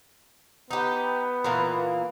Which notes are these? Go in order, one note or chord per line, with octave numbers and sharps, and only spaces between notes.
B3 D#4 G4
A#2 E3 A#3